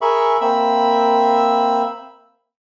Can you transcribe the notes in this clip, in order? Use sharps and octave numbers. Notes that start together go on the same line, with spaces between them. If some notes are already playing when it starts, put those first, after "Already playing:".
G#4 A#4 E5 B5 C#6
A#3 C4 E5 B5 E6